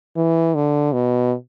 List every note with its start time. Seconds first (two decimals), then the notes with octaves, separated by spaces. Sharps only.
0.16 E3
0.55 D3
0.93 B2